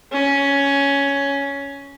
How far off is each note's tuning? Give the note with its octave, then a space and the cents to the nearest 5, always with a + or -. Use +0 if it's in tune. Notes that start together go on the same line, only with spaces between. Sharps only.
C#4 +10